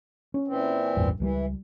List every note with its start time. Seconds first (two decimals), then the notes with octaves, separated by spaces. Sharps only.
0.34 C#4
0.48 A#2 E3 C4
0.96 A1 E2 G2
1.20 C#2 E3 F#3 G3